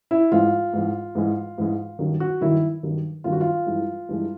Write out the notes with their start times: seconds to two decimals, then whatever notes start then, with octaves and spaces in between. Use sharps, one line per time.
0.11 E4
0.32 G#2 E3 G#3 F4
0.73 G#2 E3 G#3
1.15 G#2 E3 G#3
1.58 G#2 E3 G#3
1.99 G2 D#3 F#3
2.20 F#4
2.41 G2 D#3 F#3 E4
2.83 G2 D#3 F#3
3.24 G2 D#3 F#3 F4
3.32 F#4
3.41 F4
3.67 G2 E3 G#3
4.09 G2 E3 G#3